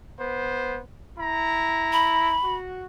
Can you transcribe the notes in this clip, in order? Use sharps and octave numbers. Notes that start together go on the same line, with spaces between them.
B3 C5
E4 A#5
B5
F#4